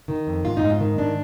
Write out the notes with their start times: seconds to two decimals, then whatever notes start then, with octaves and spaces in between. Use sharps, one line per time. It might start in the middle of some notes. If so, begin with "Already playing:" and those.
0.08 D#3
0.27 F2
0.44 G#2 F4
0.57 D#4
0.62 G#2
0.70 F4
0.80 D#3
0.98 G#2 D4